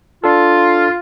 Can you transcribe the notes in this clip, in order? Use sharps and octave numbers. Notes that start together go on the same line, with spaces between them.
D4 F4 A4